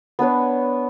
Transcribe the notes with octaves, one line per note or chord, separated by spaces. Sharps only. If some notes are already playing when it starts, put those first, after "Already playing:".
B3 D4 B4 C#5